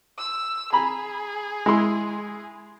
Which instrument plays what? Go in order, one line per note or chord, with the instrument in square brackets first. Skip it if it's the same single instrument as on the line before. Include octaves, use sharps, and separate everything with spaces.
[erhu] E6
[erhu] G#4 [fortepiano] A#5 B5
[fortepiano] G#3 E4 C6